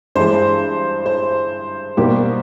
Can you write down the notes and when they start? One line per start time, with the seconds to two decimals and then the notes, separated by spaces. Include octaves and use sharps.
0.15 G2 E3 G#3 C5
1.06 C5
1.97 B2 G3 A#3 D#4 G4